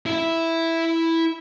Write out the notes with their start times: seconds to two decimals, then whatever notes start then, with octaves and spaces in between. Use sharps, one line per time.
0.06 E4 E5